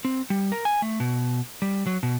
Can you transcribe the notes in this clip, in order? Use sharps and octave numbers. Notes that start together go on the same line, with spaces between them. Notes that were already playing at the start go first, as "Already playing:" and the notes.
C4
G3
A#4
G#5
A3
B2
G3
F#3
B2